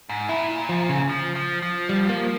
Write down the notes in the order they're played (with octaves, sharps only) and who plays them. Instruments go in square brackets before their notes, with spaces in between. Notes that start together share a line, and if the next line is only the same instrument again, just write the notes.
[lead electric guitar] G#2
[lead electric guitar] A#2 [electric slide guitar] E4
[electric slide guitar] F3
C#3
[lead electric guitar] F3
F3
F3
[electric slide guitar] G3
A#3